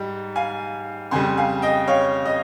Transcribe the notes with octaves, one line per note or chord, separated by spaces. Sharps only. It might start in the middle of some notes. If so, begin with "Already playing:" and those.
Already playing: G#2 G3
F5 G#5
F2 C#3 G3 G#5 C6
F5 G#5
D#5 G5
C#5 F5
D#5